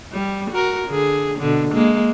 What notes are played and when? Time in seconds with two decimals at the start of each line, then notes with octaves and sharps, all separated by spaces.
0.12 G3
0.51 F#4 A#4
0.89 D3 G#4
1.39 B2 D3
1.72 G#3 A#3